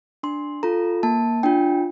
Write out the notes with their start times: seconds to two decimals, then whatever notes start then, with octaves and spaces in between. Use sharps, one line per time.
0.23 D4 C6
0.63 F4 A4 A#5
1.03 A#3 A5
1.43 D4 F4 G5